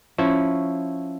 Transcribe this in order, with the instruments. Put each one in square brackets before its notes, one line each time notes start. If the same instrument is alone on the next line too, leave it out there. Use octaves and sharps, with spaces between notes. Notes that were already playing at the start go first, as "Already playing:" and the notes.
[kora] F3 E4 C#5 [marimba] C#4